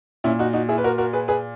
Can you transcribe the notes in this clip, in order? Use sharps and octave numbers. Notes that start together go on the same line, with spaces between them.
A#2 C#4 E4
D#4 F#4
D#4 F#4
E4 G#4
B4
F#4 A#4
F#4 A#4
G#4 B4
G#4 B4